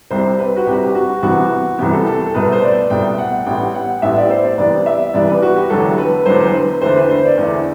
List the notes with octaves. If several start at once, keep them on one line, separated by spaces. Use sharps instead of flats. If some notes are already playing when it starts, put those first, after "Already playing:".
C2 C3 G3 C5
B4
F#4
C2 C3 G3 G4
F#4
C2 C3 E3 B3 F#4
C2 C3 E3 B3 G4
A4
A4
A4
C2 B2 A3 B4
C5
D5
C2 B2 A3 G5
F#5
A1 A2 G3 B3 G5
F#5
A1 A2 G3 B3 E5
D5
C5
D5
C2 C3 E3 G3 B3 D5
E5
C2 C3 E3 G3 B3 D5
B4
F#4
G4
E1 E2 D3 F#3 A4
B4
E1 E2 D3 F#3 C5
C5
B4
E2 D3 A3 C5
B4
C5
D5
E2 D3 A3